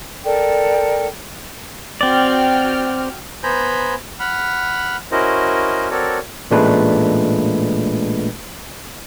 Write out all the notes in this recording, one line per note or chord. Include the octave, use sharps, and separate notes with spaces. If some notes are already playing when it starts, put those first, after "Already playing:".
A4 A#4 D5 G5
C4 F#4 D5 G5 F6
B3 C5 G#5 A#5 B5 G6
F#5 B5 F6
C#4 E4 F#4 A#4 C5 D#5
C4 F#4 A4 A#4 C#5 D5
A1 A#2 G#3 A3 D4 B4